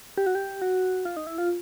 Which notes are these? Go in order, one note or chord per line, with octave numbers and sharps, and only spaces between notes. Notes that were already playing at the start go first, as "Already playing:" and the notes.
G4
F#4
G4
F#4
F4
D#4
E4
F4